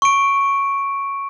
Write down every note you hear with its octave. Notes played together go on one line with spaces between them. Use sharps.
C#6 D7